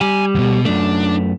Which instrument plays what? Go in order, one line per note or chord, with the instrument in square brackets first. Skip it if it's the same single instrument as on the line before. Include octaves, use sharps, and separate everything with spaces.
[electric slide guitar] G3 [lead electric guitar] G#5
[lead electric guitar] E2 B2
[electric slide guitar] F#2 A3 [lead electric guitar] D4